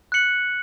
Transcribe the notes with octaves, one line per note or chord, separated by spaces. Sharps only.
F#6 C#7 F#7